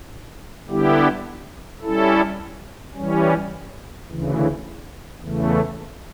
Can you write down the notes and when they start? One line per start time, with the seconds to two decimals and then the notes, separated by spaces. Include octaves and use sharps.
0.68 D3 G3 B3 E4 G4
1.82 G3 C#4 E4 A4
2.94 E3 G3 C#4
4.08 D2 C#3 E3
5.21 E2 C#3 E3 A3